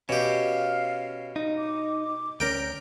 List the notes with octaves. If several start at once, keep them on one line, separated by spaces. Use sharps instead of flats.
B2 C#4 G4 F5
D#4
D6
D2 C#4 A#4 G5